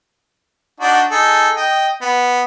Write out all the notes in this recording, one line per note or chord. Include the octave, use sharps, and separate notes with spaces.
D4 D#4 F#4
D#4 G#4 A4
D#5 G5
B3